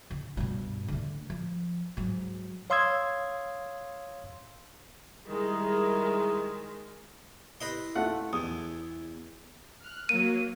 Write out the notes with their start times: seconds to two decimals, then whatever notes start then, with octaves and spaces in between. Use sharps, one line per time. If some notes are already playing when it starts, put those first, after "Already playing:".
0.11 D3
0.37 G2 B2
0.88 D3 A3
1.30 F3
1.97 G#2 F#3
2.70 C#5 F5 C6 D#6 E6 G#6
5.27 D#3 G3 G#3 E4 G#4 A#4
7.61 E4 G4 B4 D#5 C6
7.95 A3 F4 F#5
8.33 E2 E4 D#6
9.80 F6 F#6
10.09 F#3 A#3 D#7